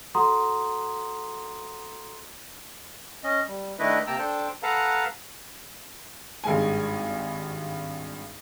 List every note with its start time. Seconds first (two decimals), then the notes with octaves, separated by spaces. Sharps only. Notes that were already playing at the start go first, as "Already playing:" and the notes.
0.15 F#4 A4 F#5 A#5 C6 D#6
3.24 C#4 D#5
3.48 G3
3.79 D#3 A3 D4 E4 B4 D#5
4.07 C3 A#3 G5 A5 A#5 E6
4.19 D4 A4 C5 G5 A5
4.63 A4 B4 F5 F#5 A5 A#5
6.44 G#1 G2 G#3 G#5